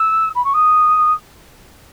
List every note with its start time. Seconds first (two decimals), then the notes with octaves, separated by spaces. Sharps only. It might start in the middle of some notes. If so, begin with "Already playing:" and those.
Already playing: E6
0.35 B5
0.44 C#6
0.54 D#6